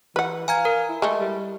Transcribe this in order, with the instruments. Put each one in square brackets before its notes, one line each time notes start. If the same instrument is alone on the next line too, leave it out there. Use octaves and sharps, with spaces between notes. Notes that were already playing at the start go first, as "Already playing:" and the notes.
[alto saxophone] E3 [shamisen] B4 F#5
[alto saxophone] F5 [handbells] G#5 A#5 G#6
[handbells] A#4
[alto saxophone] E4
[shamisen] G#3 A3
[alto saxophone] G3